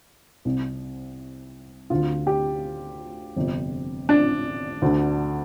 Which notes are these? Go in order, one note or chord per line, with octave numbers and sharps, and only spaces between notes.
C2 C3
D2 D3 F4
G4
G1 F2 C3
D4
D2 D3